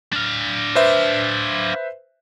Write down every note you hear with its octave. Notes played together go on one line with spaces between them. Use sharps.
D4 F5
B4 C5 E5